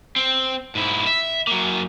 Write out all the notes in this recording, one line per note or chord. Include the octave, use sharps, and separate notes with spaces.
C4
G#2 E4
E5
F#3 A#3